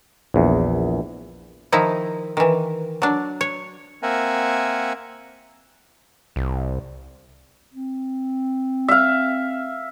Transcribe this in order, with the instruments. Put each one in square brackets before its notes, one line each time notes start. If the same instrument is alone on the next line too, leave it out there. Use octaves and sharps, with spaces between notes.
[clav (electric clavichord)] A#1 E2
[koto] D#3 F3 D#4 E4
D#3 E3
F#3 D4
C#5
[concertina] A#3 C4 A#4 E5 F#5 G#5
[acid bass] C2
[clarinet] C4
[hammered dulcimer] E5 F5